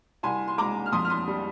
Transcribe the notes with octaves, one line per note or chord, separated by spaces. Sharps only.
C2 G#5 C6
C6
G#3 A#5 D6
F6
F2 C6 D#6
F6
C6 D#6
G3